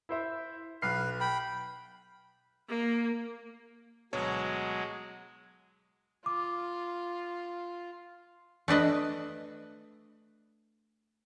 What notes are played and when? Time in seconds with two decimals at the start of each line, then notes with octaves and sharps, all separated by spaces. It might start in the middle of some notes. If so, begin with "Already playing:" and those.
0.09 E4 C5 E5
0.82 B1 B4 F6 C7
1.20 G5 B5
2.69 A#3
4.13 D2 B2 F#3 G#3 C#5
6.26 F4 D6
8.68 A3 D4 B4 D#5